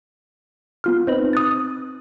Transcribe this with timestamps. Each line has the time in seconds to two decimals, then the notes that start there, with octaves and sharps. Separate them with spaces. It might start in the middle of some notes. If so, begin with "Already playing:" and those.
0.84 B3 F4 F6
1.07 C4 D#4 B4
1.33 D#6 F#6 A6